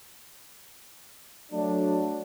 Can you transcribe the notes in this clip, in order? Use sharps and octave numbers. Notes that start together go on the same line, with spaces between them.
F#3 A3 D4